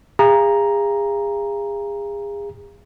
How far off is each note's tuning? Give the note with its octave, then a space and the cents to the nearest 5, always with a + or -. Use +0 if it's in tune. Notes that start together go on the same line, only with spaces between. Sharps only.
G#4 -35 F5 -25 A#5 +5